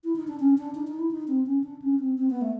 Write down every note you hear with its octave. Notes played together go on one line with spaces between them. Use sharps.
E4
D#4
D4
C#4
D4
D#4
D#4
E4
D#4
C4
C#4
D4
C#4
C4
C4
B3
A3